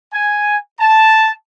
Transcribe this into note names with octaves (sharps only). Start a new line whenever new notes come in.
G#5
A5